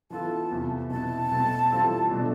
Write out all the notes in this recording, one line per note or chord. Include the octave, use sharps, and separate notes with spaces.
E3 B3 F4 A4 A5
E2 C3 E3
B2 B3 E4 A5
B2 A3 C4
E3 G3 C4 F4 A4
B2 A3 D4